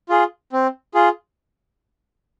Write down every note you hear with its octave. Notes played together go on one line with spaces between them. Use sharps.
F4 G#4
C4
F4 G#4